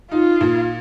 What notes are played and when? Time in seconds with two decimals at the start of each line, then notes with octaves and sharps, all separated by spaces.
0.11 D#4 F4
0.41 A#2